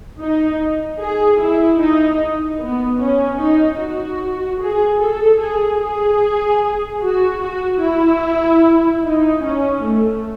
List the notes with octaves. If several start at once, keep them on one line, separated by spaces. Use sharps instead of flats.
D#4
G#4
E4
D#4
B3
C#4
D#4
F#4
G#4
A4
G#4
G#4
F#4
F#4
E4
D#4
C#4
A3